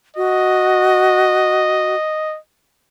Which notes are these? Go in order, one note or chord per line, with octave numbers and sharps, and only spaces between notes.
F#4 D#5